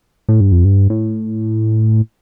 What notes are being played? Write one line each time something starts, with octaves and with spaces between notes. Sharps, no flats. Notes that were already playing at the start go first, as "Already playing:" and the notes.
A2
G2
F2
G2
A2